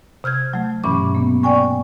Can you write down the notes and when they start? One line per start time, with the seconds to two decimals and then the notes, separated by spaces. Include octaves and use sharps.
0.24 C3 F6 G6 G#6
0.53 F#3 A3
0.84 G2 B2 E3 C#4 D6
1.15 A#3 B3
1.43 D5 G5 G#5 C#6